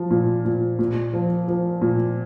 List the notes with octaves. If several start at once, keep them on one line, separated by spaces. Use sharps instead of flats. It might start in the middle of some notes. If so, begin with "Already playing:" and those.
Already playing: F3
A#2
A#2
A#2
F3
F3
A#2